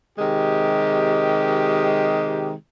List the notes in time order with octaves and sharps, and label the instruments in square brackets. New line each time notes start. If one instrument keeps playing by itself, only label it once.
[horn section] C3 D#3 G#3 G4